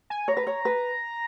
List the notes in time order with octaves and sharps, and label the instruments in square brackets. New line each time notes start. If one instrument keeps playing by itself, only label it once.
[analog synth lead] G#5
[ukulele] C#5 [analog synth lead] A#5
[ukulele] B4
C#5
B4